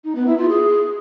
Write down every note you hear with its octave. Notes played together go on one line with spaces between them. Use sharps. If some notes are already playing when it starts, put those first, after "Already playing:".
D#4
B3
E4
F4
G#4